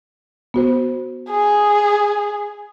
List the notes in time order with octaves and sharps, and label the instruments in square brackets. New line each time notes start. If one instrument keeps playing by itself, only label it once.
[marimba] B3 F#4 C5
[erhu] G#4